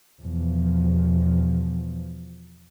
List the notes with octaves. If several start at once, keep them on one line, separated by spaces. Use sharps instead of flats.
E2 B2 F3